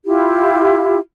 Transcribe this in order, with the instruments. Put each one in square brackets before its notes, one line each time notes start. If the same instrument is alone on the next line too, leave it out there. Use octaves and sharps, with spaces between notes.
[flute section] E4 F4 G4